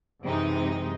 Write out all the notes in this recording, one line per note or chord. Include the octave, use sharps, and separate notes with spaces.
F#2 C3 E3 G#3 D#4